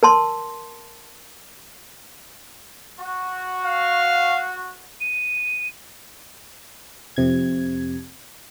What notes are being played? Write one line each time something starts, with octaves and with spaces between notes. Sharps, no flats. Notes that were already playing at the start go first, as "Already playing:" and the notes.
A#4 A5 C6
F#4
F5
D#7
F2 C3 G#6